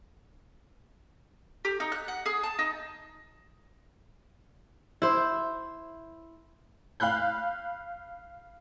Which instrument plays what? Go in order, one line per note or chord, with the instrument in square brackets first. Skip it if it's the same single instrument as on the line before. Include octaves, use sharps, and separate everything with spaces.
[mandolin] G4
D#4
F#6
F#5
G#4
A5
D#4
[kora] E4 C5
[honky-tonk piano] F5 B5 F#6 G6